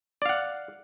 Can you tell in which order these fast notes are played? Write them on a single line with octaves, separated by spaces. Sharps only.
D5 F5 F#5